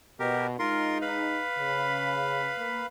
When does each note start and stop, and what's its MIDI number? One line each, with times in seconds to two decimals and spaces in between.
0.19 0.54 47
0.19 0.47 67
0.19 0.47 70
0.59 1.46 56
0.59 1.46 63
0.59 0.98 65
0.59 0.98 70
0.59 0.98 84
1.02 2.86 71
1.02 2.86 77
1.02 2.86 83
1.58 2.51 49
2.58 2.81 58